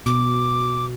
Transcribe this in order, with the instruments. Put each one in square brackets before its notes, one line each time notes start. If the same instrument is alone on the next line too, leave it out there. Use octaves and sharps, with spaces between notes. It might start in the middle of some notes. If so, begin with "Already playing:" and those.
[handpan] B2 [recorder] D6